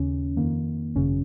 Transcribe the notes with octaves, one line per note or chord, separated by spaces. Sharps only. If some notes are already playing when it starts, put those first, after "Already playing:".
Already playing: D#2 C#3 C#4
F2 D#3 A#3
G#1 F#2 C#3 C#4